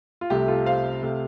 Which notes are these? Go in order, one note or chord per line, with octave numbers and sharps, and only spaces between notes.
F4
C2 C3 A3 G4
F4 A4
C5 F5
C3 A3